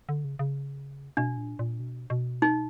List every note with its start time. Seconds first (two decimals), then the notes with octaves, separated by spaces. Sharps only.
0.09 D3
0.24 C#3
0.39 C#3
1.17 B2 D4
1.37 A#2
1.59 A#2
1.80 B2
2.10 B2
2.42 D#4